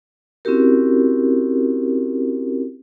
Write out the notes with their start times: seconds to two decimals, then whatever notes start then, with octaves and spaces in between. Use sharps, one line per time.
0.45 C4 C#4 E4 F#4 G4 A#4